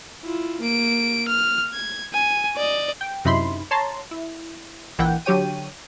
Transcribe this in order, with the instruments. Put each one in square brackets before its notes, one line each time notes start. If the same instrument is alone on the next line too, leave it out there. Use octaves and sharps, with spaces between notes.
[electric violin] E4 F4
A#3 D7
F6
G#6
G#5
D5 D#5
[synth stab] G5
F#2 C3 D#4 E4 B5 C6
C#5 A5 A#5 C6
E4
A#1 E3 A#3 E4 F#5 G5
D3 F#3 G4 C#5 G5 D#7